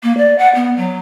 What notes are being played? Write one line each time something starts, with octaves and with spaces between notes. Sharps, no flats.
A#3
D5
F#5
B3
F#3